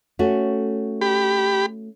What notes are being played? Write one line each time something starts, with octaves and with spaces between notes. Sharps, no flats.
A3 C#4 F#4
G4 B5